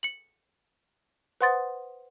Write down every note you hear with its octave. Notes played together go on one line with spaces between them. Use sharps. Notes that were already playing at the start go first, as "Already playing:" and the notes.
C#7 F#7
B4 C5 F#5 C6 D#6 A6